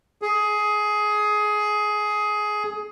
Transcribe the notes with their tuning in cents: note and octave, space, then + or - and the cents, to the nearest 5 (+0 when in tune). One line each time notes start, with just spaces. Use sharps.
G#4 +15